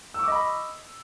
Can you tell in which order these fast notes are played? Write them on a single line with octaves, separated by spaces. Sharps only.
E6 C#6 D6 D#5 B5